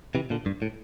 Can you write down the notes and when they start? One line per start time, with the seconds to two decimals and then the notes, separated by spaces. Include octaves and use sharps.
0.15 C3 E3
0.30 A#2 D3
0.46 G2
0.62 A2